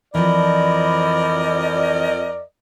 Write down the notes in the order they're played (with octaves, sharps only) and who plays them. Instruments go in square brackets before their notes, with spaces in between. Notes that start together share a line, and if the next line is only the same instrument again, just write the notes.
[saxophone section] F2 A#4 D#5 [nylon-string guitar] E3 F3 [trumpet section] D5 [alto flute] B5